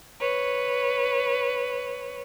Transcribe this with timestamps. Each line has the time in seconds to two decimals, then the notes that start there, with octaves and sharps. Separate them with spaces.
0.19 B4 C#5